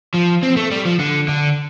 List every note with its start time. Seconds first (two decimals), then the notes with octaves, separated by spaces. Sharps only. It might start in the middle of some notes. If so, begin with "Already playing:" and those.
0.14 F3
0.43 C4
0.57 A3
0.71 G3
0.86 F3
1.00 D3
1.28 D3